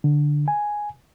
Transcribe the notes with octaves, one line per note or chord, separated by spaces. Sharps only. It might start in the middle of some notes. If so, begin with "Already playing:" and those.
D3
G#5